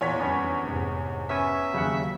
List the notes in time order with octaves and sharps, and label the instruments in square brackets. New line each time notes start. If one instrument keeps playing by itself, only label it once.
[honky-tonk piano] E2 C#5 B6 [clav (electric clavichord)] A#2
[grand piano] F2 D3 G3 [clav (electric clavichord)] B3 C#4
[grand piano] F1 G#2
[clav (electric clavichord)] B3 C#4 G#5 [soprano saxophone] E5
[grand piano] D#2 F#3 [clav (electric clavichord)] C#3 F#5